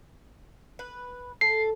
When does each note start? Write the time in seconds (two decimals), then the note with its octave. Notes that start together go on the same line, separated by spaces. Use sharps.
0.79 B4
1.41 A4 C7